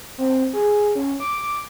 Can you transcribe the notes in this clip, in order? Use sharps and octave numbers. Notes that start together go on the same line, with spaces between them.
C4
G#4
C#4
D6